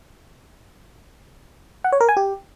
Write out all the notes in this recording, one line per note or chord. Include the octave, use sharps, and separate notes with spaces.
F#5
C#5
A#4
G#5
G4